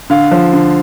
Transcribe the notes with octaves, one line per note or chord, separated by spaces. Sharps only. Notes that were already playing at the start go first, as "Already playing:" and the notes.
D3 F5
F3
D3